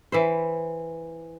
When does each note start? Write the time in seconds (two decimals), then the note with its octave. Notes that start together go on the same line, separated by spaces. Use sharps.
0.12 E3 E4 C5